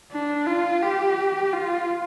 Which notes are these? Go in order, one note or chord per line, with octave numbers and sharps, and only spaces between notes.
D4
F4
G4
F4